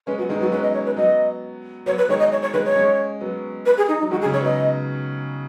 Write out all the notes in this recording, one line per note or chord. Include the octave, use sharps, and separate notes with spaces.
G#3 C#4 B4
F#3 B3 F#4
D#3 G#3 D#4
F#3 B3 F#4
G#3 C#4 B4
D#5
C#5
B4
F#3 B3 D#5
F#3 B3 C#5
B4
D#3 G#3 C#5
D#5
C#5
C#5
D#3 G#3 B4
C#5
G#3 C#4
F#3 B3
B4
G#4
D#4
D#4
F#3
D#3 G#3 F#4
G#4
C#3 F#3
C#5
F#3 B3
D#5